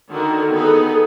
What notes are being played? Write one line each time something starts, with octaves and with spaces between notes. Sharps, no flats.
D3 D#3 F#4 A#4
B3 D#4 G#4 A4 B4